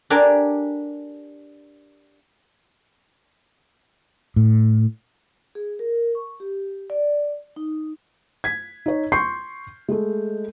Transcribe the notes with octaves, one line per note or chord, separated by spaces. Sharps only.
D4 G4 A#4 G#5 C6
A2
G#4
A#4
C#6
G4
D5
D#4
G#6 B6
D#4 C#5
C6 C#6 G6 C7
G#3 A3